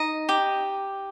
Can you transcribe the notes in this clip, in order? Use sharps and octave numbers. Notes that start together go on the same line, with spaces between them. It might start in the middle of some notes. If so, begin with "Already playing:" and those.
Already playing: D#4 D#5
G4